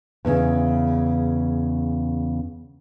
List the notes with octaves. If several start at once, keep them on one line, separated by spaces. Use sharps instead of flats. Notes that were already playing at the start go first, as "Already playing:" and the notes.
E2 A#2 C#3